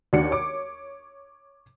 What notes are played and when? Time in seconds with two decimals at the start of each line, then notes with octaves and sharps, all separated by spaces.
0.13 D#2 D4 F#4 C#7
0.31 C#5 D6